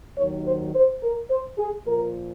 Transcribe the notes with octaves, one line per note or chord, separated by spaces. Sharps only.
D#2 D#3 F#3 C#5
C5
C5
A#4
C5
G#4
A#2 F3 A#4